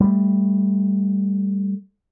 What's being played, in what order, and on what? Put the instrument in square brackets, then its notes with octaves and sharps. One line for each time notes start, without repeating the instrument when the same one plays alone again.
[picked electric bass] G3 A3